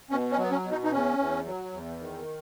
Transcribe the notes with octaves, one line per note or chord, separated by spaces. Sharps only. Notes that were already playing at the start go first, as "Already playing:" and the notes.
B2 C#4
C#4
F#3
B3
C#4
B2
D#4
D#4
E2 C#4
E2
F#3
E2
D#3